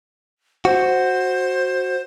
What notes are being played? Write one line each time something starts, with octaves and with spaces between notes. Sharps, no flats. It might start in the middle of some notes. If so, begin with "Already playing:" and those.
F#4 C5